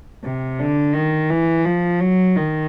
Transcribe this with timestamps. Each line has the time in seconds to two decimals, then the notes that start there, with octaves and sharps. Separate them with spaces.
0.24 C3
0.60 D3
0.94 D#3
1.30 E3
1.65 F3
2.00 F#3
2.36 D#3